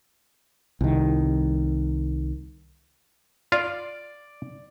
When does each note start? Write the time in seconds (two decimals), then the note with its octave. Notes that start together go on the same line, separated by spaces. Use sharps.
0.81 C2 D#3
3.52 F4 D5 F5